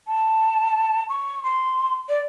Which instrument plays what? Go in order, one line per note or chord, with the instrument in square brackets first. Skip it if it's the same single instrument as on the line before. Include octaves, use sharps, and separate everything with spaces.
[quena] A5
C#6
C6
D5